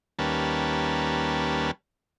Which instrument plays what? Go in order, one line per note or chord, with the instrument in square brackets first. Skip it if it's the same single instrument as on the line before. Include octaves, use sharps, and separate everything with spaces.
[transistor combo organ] D#2 G3 A#3 C#4 B4 A5